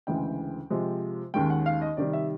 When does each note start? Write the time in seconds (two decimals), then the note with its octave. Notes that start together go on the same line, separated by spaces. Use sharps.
0.07 D2 C#3 E3 G#3 G5
0.70 C3 F3 G#3
1.34 D#2 D#3 G#3 C#4 G5
1.50 F#5
1.66 F5
1.82 D#5
1.97 C3 D#3 G3 D5
2.13 E5